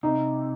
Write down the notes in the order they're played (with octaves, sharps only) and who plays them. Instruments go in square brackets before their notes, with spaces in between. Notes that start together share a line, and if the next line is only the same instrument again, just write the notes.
[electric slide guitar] C3 [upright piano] D#4